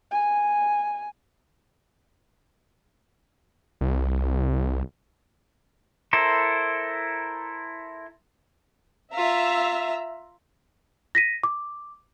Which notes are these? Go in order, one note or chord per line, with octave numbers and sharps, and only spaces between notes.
G#5
C2
E4 A4 A#4 C5
F4 E5 A#5
A#6 B6 D#7
D6